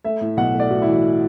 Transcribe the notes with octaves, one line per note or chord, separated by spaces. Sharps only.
A3 E5
A2
B1 F#5
A3
D5
A2 F#4
E4
E3
F#4